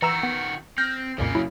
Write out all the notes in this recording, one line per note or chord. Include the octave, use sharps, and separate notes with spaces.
D#3 E3 F#4 A#5 E6
B3
C4 F6 G6 A#6
C2 F2 A#2 C#3 A#3
F#3 E4